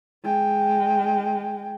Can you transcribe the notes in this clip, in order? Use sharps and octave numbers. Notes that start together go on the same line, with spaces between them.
G#3 G5